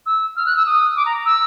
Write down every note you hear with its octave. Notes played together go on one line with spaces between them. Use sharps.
E6
F6
F#6
E6
D#6
D6
A#5
E6